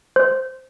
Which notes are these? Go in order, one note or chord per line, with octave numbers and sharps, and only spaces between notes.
C5